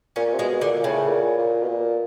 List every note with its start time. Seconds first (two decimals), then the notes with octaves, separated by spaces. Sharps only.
0.16 A#2 C#4
0.33 C3
0.39 B2 G#3
0.61 A#2 D3
0.80 A#2
0.84 A2 C#3
1.08 A#2
1.38 A#2
1.63 B2
1.68 A#2